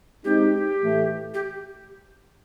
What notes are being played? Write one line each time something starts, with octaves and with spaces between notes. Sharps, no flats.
G#3 C4 D#4 G4
A2 E3 A3
G4